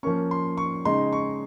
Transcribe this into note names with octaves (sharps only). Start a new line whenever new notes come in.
F3 A#3 C#4 C#6
C6
C#6
C#3 G#3 D#4 C6
C#6